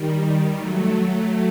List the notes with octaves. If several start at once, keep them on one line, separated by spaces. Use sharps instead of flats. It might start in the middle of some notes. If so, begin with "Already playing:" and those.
Already playing: D#3 G3
F#3 A3